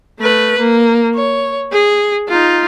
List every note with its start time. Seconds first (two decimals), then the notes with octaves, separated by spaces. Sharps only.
0.20 A3 B4
0.58 A#3
1.15 C#5
1.72 G#4
2.29 D#4 F4